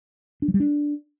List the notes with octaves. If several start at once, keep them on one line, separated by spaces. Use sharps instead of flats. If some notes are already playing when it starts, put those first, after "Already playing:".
D4
F#3
G3
D4